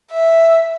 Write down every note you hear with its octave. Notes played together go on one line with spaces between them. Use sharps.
E5